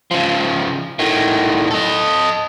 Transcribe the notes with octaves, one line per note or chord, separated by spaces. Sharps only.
C#3 F3
A2 D#3
A4 D#5